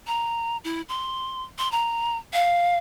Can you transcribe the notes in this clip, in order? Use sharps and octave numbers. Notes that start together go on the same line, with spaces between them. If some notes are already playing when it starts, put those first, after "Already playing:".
A#5
E4
C6
C6
A#5
F5